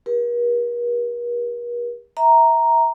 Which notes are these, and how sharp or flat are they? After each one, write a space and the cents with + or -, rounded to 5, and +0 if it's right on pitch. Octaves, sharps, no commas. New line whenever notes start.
G4 +20 A#4 +45
E5 -20 A#5 +0